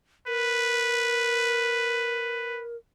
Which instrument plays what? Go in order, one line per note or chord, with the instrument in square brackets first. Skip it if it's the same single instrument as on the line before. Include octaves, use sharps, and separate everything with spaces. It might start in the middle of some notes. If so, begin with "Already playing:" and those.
[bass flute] A#4 [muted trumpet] B4